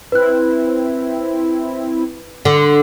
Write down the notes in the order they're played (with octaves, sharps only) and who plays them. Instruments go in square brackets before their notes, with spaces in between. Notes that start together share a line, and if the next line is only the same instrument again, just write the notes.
[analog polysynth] C4 E4 [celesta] B4 F#6
[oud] D3 [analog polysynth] C6